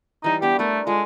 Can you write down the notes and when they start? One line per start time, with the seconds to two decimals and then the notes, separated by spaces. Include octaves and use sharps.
0.24 E3 G3 D#4
0.42 B3 D4 G4
0.59 A3 A#4 B4
0.87 G#3 F4 A4